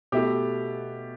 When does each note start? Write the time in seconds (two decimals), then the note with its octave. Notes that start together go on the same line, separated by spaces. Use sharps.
0.12 B2 A3 E4 G4 A4